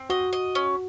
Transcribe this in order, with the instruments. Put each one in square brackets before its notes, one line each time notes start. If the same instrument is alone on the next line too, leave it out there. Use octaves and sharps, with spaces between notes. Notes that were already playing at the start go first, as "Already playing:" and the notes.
Already playing: [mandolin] C4
[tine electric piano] F#4 [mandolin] D#5
[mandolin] D#5
C#4